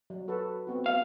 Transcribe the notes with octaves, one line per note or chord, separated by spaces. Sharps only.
F#3
F#4 A4 B4
B3 C4 F#4
F5